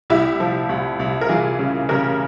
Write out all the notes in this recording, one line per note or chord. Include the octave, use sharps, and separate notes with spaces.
C2 E4 G4
F3
C2
C2
A#4
E3 F4 G#4
C#3
C#3 G4 A#4